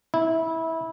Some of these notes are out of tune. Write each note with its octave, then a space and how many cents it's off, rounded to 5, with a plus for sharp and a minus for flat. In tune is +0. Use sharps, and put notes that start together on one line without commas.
E4 -20